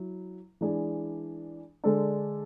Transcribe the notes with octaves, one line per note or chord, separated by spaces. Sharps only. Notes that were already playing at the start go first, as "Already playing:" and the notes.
Already playing: F#3 E4
E3 G#3 D4 G#4
D3 G#3 D4 A4